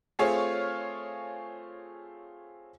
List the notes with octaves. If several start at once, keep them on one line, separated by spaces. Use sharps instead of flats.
A3 C4 F4 G#4 C#5 F5